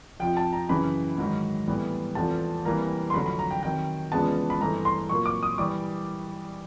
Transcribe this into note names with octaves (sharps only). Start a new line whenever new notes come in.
F2 C3 F3 G5
A5
A#5
F#2 C#3 E3 B5
G#2 D#3 F#3
A2 E3 G3 B3
E2 C3 F3 A3 C4 A5
C3 E3 G3 A#3 A#5
C6
F2 D3 F#3 A3 B5
B5
A#5
G5
C3 D#3 F#3 G5
E2 C#3 F3 G#3 B3 A5
B5
G2 E3 A3 C4 A#5
C6
A#2 F#3 A#3 C#6
D6
D#6
E3 G3 D6